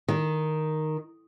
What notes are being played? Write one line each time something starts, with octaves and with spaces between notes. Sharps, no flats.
D#3